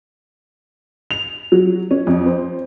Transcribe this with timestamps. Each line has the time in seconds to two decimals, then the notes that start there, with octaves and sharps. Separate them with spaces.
1.11 F7
1.52 F#3
1.91 C#4
2.07 F2
2.26 C5